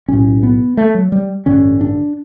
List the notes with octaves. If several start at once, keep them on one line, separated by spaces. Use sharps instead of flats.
B1 A2 C#4
B3
A3
F#3
G3
A1 G2 D3 C#4
D4